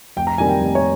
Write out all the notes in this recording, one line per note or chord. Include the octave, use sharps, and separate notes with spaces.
F1 G5
A#5
F2 D#3 G3 A#3 G#5
G5
F1
C#5